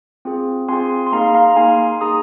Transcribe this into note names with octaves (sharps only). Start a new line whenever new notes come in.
C4 F4 G#4
C4 F4 G#4 G#5 C6
C6
A#3 D#4 G#4 F5 A#5
F5 A#5
A#3 D#4 G#4 G#5 C6
A#3 D#4 G#4 A#5 D#6